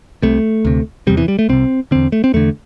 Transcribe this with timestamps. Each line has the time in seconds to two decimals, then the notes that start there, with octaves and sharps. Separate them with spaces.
0.22 C2 C3 A3
0.65 D2 C3
1.07 E2 C3 G3
1.17 E3
1.28 G3
1.39 A3
1.49 C2 C3 C4
1.91 E2 D3 C4
2.12 A3
2.24 C4
2.34 E2 D3 A3